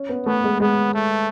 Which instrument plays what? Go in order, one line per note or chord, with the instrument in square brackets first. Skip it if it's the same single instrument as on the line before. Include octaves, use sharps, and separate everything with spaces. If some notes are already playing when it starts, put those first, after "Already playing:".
Already playing: [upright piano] C#4
B3
[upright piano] A3 [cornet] B3
[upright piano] G#3
[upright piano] G#3 [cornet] B3
[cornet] A3